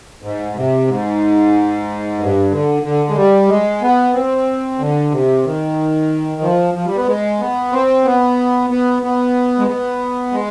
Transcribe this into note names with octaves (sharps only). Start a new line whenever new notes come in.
G#2
C3
G#2
G2
D3
D3
G#3
G3
G#3
B3
C4
D3
C3
D#3
F3
F3
G3
B3
G#3
B3
C4
B3
B3
B3
G#3
B3
G#3